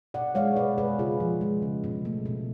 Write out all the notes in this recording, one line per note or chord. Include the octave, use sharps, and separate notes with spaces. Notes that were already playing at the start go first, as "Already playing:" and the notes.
B2 D5 F#5
G#3 C#5 F5
B2 B4 D5
G#3 G#4 B4
C#3 F4 G#4
F3
G#3
C#3
B2
A3
B2